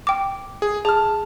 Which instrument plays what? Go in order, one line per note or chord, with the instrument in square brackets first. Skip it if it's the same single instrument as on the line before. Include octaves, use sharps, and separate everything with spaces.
[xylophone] G5 D6
[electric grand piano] G#4
[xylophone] G#4 [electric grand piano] A5 F6